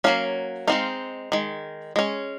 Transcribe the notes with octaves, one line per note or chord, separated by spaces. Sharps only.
F#3 A#3 C#4 F5
G#3 C4 D#4 F5
D#3 G#3
G#3 C#4